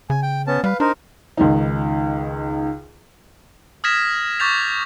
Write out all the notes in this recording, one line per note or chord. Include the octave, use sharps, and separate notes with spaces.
C#3 G#5
G5
B3 C#4 A5
G3 B4 F5
D4 D#4 A#4 C5
C#2 D#3 D#4
D#6 F6 G#6 A#6 B6 E7
C#6 D6 G6 A6 B6 F7